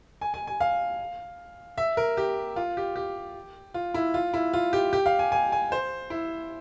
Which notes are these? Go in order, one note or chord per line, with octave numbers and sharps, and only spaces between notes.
G#5
G#5
G#5
F5
E5
A#4
G4
F4
G4
G4
F4
E4
F4
E4
F4
G4
G4
F5
G#5
G#5
G#5
C5
E4